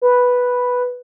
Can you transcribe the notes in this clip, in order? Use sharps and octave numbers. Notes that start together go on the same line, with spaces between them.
B4